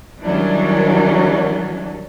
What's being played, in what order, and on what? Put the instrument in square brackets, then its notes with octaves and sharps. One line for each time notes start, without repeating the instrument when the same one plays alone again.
[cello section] D#3 E3 F#3 G3 C#4 D4